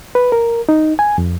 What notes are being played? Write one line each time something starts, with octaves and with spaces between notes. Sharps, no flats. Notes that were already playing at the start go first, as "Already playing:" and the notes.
B4
A#4
D#4
G#5
F2